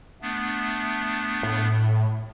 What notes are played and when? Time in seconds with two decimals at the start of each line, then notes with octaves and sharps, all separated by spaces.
0.22 A3 B3 D4
1.43 A2